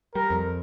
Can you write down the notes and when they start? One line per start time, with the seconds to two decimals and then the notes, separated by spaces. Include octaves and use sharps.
0.15 G3 A#4
0.30 F2